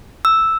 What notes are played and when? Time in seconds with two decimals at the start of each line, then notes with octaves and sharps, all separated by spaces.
0.25 E6